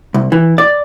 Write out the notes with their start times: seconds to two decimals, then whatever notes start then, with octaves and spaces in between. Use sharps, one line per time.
0.14 C2
0.32 E3
0.58 D5